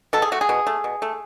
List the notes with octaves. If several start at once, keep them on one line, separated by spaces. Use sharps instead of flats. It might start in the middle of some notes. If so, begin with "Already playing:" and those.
B2 A4
G#4
A3 F#4
G#4
B2
A3
B2
A3